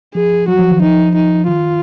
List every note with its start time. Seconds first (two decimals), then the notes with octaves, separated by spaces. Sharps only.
0.14 F3 G#4
0.48 F#3 F#4
0.59 F3
0.71 D#3
0.82 F3 D#4
1.15 D#4
1.48 D#3 F4